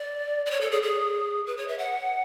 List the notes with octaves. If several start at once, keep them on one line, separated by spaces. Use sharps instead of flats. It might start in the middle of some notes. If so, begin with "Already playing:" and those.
Already playing: D5
D5
C#5
A4
G#4
G#4
B4
C#5
E5
F#5